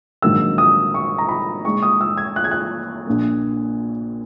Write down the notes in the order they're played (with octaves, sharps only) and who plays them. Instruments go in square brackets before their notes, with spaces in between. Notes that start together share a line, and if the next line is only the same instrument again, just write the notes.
[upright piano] A#1 G#2 D#3 F#3 A#3 E6
D#6
C#6
A#5
B5
A#2 G#3 D#4 C#6
D#6
E6
G#6
F#6
G#6
F#6
A#1 A#2 A#3